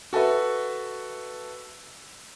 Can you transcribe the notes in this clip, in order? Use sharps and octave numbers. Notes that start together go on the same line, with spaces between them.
F#4 A4 B4 E5